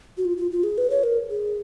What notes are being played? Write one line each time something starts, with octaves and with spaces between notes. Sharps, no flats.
F#4
F4
F4
F4
G#4
B4
C#5
A#4
G#4